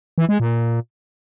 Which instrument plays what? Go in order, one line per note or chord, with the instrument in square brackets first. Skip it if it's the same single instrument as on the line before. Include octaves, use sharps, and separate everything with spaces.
[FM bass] E3
G#3
A#2